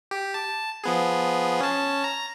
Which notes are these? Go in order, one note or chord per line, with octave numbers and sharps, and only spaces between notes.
G4
A5
F3 B3 G#4
C#4 A5
A#5